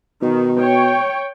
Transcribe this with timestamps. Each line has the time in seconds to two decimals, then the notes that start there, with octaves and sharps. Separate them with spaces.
0.22 B2 D#3
0.59 C#5 G5